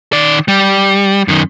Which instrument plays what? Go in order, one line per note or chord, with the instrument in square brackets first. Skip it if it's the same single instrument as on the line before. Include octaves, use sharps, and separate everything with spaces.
[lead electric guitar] D#3 D5
G3
F#2 D#3